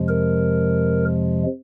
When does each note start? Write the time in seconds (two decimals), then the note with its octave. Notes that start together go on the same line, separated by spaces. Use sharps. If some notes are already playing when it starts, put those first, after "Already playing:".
Already playing: F2 C3 F3 G#3
0.08 A#4